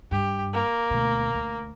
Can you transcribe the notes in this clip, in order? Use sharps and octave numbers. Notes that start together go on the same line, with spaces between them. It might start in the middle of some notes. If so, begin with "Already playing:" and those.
G2 G4
A#3
D2 B2
D2